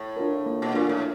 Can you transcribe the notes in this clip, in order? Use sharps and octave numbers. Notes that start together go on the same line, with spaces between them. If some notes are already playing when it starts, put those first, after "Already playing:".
Already playing: A2
D4 F4 A#4
A#3
B2
A#2 D4 F4 A#4
A2